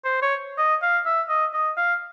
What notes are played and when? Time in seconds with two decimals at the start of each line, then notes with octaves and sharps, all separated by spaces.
0.05 C5
0.22 C#5
0.58 D#5
0.82 F5
1.06 E5
1.29 D#5
1.54 D#5
1.77 F5